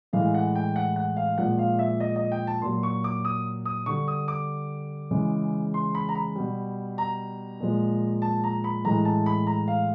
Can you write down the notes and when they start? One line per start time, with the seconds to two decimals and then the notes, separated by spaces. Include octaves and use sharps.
0.13 A2 E3 G#3 F5
0.35 F#5
0.55 G5
0.76 F#5
0.96 F#5
1.17 F5
1.38 A#2 F3 G#3 F#5
1.59 F5
1.79 E5
2.00 D#5
2.16 D#5
2.32 G5
2.47 A5
2.62 A#2 F#3 C6
2.83 C#6
3.04 D6
3.25 D#6
3.65 D#6
3.86 D3 G3 C#6
4.08 D#6
4.28 D6
5.11 C#3 E3 G#3
5.74 C6
5.95 B5
6.09 A#5
6.15 B5
6.36 B2 G3
6.98 A#5
7.60 A#2 F3 G#3
8.22 A5
8.44 A#5
8.64 B5
8.84 A2 E3 G#3 A#5
9.05 A5
9.26 B5
9.47 A#5
9.68 F5